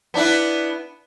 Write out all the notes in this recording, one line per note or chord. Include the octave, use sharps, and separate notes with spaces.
B3 D4 E4